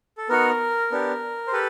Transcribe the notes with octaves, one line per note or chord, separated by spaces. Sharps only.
A4
B3 D#4 F#4 A#4
B3 D4 G4
C5
G4 A4 B4